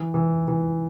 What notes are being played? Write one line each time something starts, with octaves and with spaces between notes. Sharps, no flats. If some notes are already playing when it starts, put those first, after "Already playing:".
Already playing: E3
E3
E3